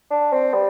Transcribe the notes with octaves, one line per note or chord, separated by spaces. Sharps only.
D4
C4
G3